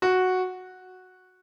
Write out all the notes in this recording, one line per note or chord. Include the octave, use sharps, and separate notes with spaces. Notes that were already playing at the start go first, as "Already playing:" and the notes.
F#4